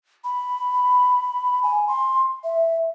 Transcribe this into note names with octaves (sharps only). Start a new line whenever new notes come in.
B5
G#5
C6
E5